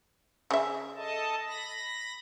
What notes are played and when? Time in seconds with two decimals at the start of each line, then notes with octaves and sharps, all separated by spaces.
0.51 C#3 E5
0.96 A4 D#5 A5
1.48 B5 A#6